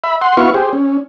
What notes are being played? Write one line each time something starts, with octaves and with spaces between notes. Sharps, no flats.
E5 B5
F#5 C6
B3 E4 F#4 B4 F5 C#6
G4 G#4 C5
C#4